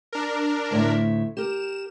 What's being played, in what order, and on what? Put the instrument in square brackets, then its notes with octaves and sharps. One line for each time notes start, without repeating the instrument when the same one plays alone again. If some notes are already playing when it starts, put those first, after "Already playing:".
[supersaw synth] D4 A#4
[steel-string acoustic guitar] D2 A2 E5
[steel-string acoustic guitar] G4 A#4 [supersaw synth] E7